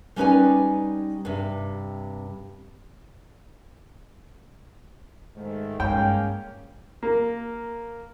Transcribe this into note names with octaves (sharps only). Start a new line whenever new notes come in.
G3 C#4 D#4 B4 D5 G#5
G2 C3
G#2 D#3 A3
G2 G#3 A#3 C#4 G5
A#3